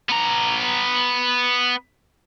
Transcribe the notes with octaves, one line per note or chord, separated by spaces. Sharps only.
B3 A#5